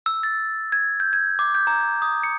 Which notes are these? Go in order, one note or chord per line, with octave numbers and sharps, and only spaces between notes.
E6
A6
G#6
G6
G#6
D6
G6
A#5
D#6
C#7